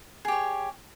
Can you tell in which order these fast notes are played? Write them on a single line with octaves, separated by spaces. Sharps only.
G#4 G4 C#5